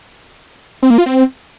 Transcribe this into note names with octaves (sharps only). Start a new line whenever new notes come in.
C4
A#3
F4
C4